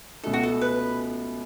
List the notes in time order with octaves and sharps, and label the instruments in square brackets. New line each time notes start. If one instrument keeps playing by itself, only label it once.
[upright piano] C#2 B2 A3 [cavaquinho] A4
[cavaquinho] F#4
A4
B4